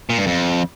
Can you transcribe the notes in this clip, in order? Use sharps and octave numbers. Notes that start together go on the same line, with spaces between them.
A#2
G2
F2